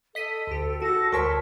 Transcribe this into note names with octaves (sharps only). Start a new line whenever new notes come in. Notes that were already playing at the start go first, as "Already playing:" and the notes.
A4 D#5 B6 D#7
D2 G4
F#4 A4 A#6
D2 A#4 C#5 A5 C6 C#6 B6